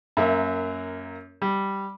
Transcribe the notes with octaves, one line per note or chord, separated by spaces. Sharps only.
F#2 A#3 E5
G3